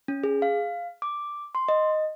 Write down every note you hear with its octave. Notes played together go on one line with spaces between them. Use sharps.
C#4
G#4
F5
D6
C6
D#5